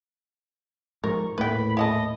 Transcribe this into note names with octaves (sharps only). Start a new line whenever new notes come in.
G#2 F3 G3 A#4 C#6
D#1 A2 A3 A#3 B4 G5 B5
E4 D#5 F#5 A5